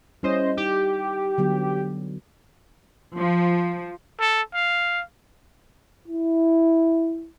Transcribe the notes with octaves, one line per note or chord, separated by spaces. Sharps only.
G3 C#4 E4 C5 D#5
D#4 G4
D3 F#3 B3
F3
A4
F5
E4